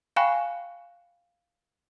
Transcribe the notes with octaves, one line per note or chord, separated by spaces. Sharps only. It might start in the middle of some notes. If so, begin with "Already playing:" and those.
F5 G5 G#5 B5 C#6 F#6